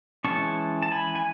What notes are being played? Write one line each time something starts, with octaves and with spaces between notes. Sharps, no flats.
E3 G#3 C#4 A5 C#6
A5
G#5 B5
G#5